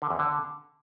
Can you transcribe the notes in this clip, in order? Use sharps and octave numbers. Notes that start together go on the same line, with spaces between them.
D3
E2
D3